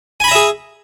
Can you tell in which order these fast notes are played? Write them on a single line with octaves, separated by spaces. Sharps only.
G#5 B5 A#5 E5 G#4